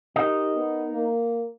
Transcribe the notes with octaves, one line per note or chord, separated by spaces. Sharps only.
D#4 G4 A#4 D#5
B3
A#3